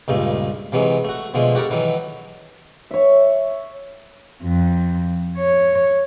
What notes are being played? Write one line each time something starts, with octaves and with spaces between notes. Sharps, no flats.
C#2 G2 A#2 A3
C3 E3 F#3 G#3
A3 F#4
B2 D3 F3 G#3 A3
F#4 G4 A4 A#4
D#3 E3 F#3
C#5 E5
F2
C#5